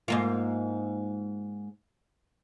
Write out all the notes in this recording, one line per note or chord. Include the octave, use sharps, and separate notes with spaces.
G#2 A#3 F4